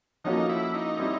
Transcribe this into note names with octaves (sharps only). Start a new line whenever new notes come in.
F3 A#3 C#4 D#4 F#4 A4
E4
D#4
G3 C4 E4